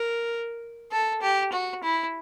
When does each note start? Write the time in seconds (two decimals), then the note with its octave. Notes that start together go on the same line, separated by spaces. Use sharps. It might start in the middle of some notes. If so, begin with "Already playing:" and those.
Already playing: A#4
0.92 A4
1.22 G4
1.52 F#4
1.83 E4